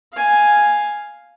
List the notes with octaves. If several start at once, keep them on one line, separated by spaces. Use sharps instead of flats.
F5 G#5